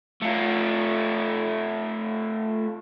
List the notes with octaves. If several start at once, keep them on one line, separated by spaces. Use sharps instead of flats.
A3 F4